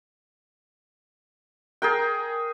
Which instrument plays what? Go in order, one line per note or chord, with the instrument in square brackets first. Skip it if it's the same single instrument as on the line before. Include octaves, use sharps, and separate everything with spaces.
[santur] G#4 A#4 G5